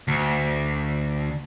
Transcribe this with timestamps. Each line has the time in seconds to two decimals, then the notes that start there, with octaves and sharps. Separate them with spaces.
0.08 D2